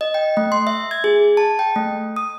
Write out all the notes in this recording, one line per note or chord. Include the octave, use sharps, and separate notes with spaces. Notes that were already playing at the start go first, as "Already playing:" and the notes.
D#5
G5
A3
C6
E5
G#6
G#4
A5
G5
A3
D#6